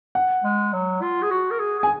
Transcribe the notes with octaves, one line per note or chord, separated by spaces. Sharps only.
F#5
G#3
F#3
F4
G#4
F#4
A#4
G#4
G#4
G#5